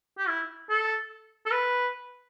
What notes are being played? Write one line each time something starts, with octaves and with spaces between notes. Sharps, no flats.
G4
E4
A4
A4
B4